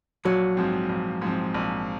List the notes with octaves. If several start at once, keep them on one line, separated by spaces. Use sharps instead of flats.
A#1 F#3
G#2 F3 C4
A#1
G#2 F3 C4
A#1